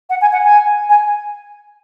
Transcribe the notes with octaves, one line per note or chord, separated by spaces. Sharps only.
F#5
G#5
F#5
G#5
G#5